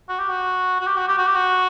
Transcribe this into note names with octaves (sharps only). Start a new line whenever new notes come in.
F#4
G4
F#4
F#4
G4
F#4
G4
F#4
G4
F#4